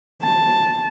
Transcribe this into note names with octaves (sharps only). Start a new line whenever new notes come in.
A5